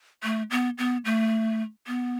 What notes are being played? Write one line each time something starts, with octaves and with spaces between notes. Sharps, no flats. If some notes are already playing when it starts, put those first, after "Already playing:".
A3
B3
B3
A3
B3